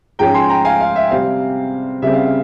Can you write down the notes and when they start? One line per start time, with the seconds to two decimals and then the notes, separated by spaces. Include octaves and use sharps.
0.19 G#2 F3 G#3 C#4 G5 A#5
0.34 G#5 C6
0.49 G5 A#5
0.65 F5 G#5
0.80 F5
0.96 E5
1.11 C3 G3 C4 F5
2.02 C#3 G3 C4 E5
2.14 F5
2.26 F5